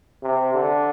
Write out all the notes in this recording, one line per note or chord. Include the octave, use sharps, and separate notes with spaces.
C3
D3